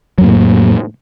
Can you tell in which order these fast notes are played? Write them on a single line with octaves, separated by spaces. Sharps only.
F#3 F2 A#3 A2